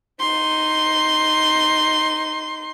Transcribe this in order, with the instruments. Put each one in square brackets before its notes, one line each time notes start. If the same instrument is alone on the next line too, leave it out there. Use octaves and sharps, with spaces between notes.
[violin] D#4 C6